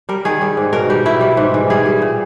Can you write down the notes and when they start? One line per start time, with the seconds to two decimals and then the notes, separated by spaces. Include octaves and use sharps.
0.09 G3 A#4
0.25 D#3 G#4
0.42 G3
0.57 G#2
0.73 B2 A#4
0.90 G3 G4
1.06 B2 E4
1.21 G3
1.37 G#2
1.54 E3
1.70 G3 G#4
1.86 G3
2.02 A#2